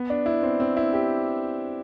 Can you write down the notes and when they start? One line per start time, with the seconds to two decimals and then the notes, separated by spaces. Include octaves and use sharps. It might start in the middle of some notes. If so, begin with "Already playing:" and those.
Already playing: B3
0.10 D4
0.26 E4
0.43 C4
0.60 C4
0.77 E4
0.93 G4